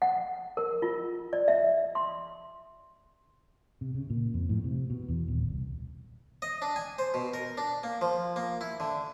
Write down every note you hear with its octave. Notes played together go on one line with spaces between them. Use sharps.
F#5
A#4
F4
D5
E5
C6
C3
C#3
A#2
F2
A2
C3
B2
E2
D#1
C2
D#5
D4
G#5
C5
B2
A#4
D4
A#3
F3
A#3
E4
D3